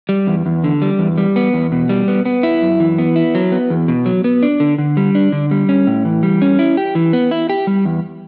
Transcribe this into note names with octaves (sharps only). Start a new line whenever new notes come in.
G3
E2
E2
D3
G3
E2
G3
B3
E2
B2
G3
B3
B3
E4
F#2
E3
B3
E4
F#3
B3
E2
B2
F#3
B3
D4
D3
D3
G3
D4
D3
G3
C#4
A2
E3
G3
C#4
E4
G4
E3
B3
E4
G4
G3
E2